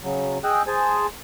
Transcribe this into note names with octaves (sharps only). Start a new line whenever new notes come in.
C#3 F#3
G#4 D#5 G5 E6 F#6
G#4 C5 G#5 A5